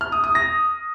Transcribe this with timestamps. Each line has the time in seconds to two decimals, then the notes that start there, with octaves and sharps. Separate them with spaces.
0.01 F6
0.12 D#6
0.24 D#6
0.35 A#6